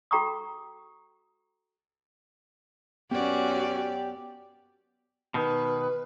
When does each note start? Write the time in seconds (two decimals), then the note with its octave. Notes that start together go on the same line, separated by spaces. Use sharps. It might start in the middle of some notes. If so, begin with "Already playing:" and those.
0.11 F#4 A4 G5 A#5 C#6 D#6
3.11 F#2 B3 C#4 F#4 G4 D5
5.34 B2 D#3 B4